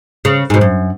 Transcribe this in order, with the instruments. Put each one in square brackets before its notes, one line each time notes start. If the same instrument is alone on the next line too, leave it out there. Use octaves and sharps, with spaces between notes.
[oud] C#3
G#2 B2
F#2